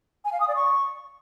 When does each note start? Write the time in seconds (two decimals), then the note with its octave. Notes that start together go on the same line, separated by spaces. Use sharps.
0.25 G#5
0.33 F5
0.40 D#6
0.48 D5
0.56 C#6